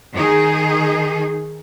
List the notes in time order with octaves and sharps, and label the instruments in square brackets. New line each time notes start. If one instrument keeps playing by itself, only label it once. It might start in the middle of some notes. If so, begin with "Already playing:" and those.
[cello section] D#3 D#4 G#4